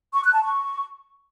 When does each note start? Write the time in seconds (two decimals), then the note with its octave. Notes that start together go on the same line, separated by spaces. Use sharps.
0.14 C#6
0.24 F#6
0.34 A5
0.44 C#6